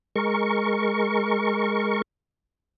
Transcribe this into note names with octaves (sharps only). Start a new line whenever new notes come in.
G#3 A#4 C#6